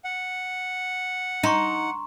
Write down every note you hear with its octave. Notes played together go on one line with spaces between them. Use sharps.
F#5
D#4 A#5 C6 C#6